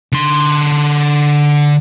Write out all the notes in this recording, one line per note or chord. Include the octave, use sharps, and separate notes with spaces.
D3 C6